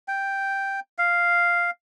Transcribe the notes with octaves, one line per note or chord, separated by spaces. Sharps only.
G5
F5